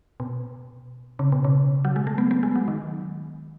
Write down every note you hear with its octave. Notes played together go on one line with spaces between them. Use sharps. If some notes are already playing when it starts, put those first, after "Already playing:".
B2
C#3
B2
C#3
F#3
G#3
A3
B3
B3
G#3
F#3
D#3